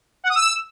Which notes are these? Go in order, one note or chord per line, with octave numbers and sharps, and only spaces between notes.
F#5
D#6
E6